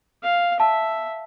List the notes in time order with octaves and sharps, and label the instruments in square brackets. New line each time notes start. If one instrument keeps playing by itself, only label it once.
[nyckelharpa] F5
[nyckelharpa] E5 [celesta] A5